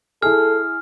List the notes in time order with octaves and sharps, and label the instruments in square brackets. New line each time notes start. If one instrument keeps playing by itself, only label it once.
[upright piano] E4 G#4 [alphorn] A4 [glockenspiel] F6